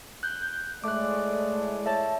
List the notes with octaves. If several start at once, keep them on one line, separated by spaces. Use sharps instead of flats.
F#6 G6
A2 G#3 A3 D5 D6 F#6
C#5 E5 A5